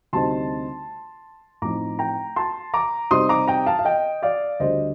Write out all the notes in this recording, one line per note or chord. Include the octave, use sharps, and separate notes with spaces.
D2 C3 G3 C4 D#4 A5 C6
A2 F3 C4 D#4 A#5 D6
G5 A#5
A5 C6
A#5 D6
C3 G3 C4 D#4 C6 D#6
A#5 D6
G5 A#5
F5 A5
F5
D#5 G5
D5 F5
D2 D3 G3 D4 C5 D#5